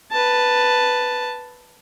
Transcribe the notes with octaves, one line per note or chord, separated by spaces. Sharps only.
B4 A5